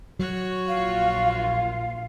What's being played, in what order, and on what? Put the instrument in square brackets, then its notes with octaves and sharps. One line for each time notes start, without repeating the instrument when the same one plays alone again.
[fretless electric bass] F#3 [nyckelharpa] F#4 C#5
[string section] A#1 F4 [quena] F5